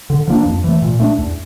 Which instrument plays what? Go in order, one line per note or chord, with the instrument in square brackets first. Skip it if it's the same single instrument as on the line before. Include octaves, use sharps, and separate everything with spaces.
[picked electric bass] D3
F3 A#3 D4
F2
E3 A3
A#2
A3 D4
E2